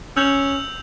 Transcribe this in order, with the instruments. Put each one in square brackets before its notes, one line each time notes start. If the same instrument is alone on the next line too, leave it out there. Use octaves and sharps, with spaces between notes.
[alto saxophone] C#4 [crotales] E6 G6 F7